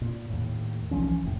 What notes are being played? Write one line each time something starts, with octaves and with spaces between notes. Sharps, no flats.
A#2
D#2 A2
B1 E3 F3 C#4
F1 A2